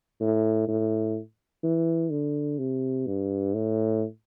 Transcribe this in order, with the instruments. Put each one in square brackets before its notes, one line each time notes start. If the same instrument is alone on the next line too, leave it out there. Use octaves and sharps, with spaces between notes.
[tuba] A2
A2
E3
D3
C3
G2
A2